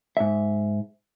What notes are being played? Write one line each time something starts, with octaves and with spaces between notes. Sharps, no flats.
G#2 E5